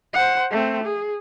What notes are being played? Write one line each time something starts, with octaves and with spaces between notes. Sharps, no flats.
C5 F#5
A3 C4
G#4